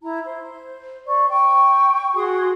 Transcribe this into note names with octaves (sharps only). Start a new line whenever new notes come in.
E4 A#5
C5
C5 D5 C#6
G5 C#6
F#4 G#4 C6 D#6